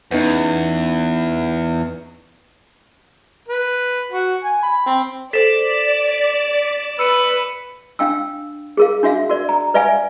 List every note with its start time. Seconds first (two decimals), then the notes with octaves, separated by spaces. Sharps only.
0.11 E2 B3 C#4 D#4
3.48 B4
4.11 F#4
4.44 G#5
4.62 B5
4.86 C4
5.33 A4 C5 D5 B6 E7
6.99 B4 E6 C#7 D#7
7.99 D4 F5 G5 E6
8.77 G#4 A#4 F5
9.03 D4 F#4 E5 F5
9.29 F#4 A#4 D5
9.49 A#5
9.74 B4 D5 E5 F5 G#5